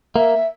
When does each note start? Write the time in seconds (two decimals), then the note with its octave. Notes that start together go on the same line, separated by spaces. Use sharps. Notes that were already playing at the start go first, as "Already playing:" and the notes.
0.15 A#3 E5